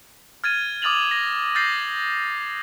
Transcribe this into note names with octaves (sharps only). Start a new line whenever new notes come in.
F6 G#6 A6 D#7
D6 D#6 F6 A6 F7 F#7
A#6
F6 G6 A6 A#6 C7